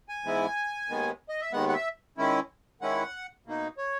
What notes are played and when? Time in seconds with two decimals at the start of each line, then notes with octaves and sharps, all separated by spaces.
0.09 G#5
0.24 G#2 E3 G#3 B3 E4
0.89 D#2 D#3 G#3 B3
1.29 D#5
1.41 E5
1.53 D#2 D#3 G#3 B3 F#5
1.69 F#5
1.73 E5
2.17 D#3 G#3 C#4 E4
2.81 D#3 G#3 C#4 E4 F#5
3.46 B2 A#3 D#4
3.78 C#5